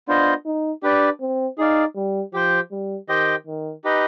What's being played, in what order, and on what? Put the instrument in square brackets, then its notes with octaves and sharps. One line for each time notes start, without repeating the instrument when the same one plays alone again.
[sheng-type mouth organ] B3 F4 C5 D#5 [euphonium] D4
[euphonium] D#4
[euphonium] D4 [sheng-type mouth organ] G4 B4 D5
[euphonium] C4
[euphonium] D#4 [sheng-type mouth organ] G#4 D5 F5
[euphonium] G3
[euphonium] F3 [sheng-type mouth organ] G4 C5 G5
[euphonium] G3
[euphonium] D#3 [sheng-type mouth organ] G4 C5 D#5 G5
[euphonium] D#3
[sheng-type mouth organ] D#4 G4 B4 D#5